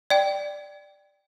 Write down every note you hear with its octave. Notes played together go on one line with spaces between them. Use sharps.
D5 G5